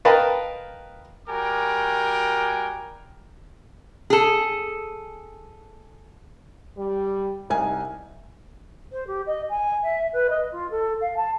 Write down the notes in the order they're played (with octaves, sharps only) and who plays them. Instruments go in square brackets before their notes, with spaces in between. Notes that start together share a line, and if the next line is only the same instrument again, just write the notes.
[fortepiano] A#4 B4 D#5 F5 G5 A5
[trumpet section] G3 F#4 A#4 G5 G#5 D6
[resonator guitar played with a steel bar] G#4 A4
[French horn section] G3
[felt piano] C2 G#5 [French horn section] D#4
[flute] C5
G4
D#5
G#5
E5
B4
D#5
F4
A4
F5
A5